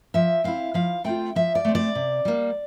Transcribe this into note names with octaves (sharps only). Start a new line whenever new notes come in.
F3 E5
C4 E4 F5
F3 F5
A3 C4 F4 G5
F3 E5
D5
A3 C4
D5
C3
G3 A#3